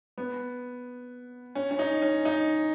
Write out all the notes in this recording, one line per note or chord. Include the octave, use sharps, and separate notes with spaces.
B3
C#4
C#4
D#4
C#4
D#4